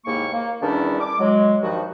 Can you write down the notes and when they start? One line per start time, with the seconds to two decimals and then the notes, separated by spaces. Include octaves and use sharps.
0.05 D#2 G#2 A#3 E4 C#6
0.33 A#3
0.62 E2 D#3 G3 C#4 D4 E4
1.01 D6
1.19 F#3 G#3
1.62 G2 D#3 F3 F#4